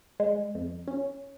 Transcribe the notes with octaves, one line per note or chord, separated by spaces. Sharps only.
G#3
F2
C#4